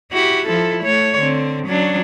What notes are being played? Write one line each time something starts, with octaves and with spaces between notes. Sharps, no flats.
E4 F#4 G4
F3 E4 A4
A3 C#5
D3 C4
F#3 C#4 D4